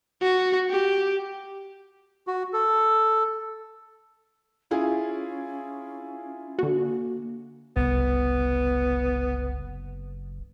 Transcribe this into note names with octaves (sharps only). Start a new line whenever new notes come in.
F#4
G4
F#4
A4
C#4 E4 F4 G#4
D3 A#3 F#4
F#1 C2 B3